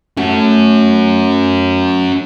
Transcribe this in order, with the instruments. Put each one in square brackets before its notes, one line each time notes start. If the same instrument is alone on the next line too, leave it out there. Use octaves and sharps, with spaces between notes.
[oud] A3 [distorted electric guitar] C#4 F#4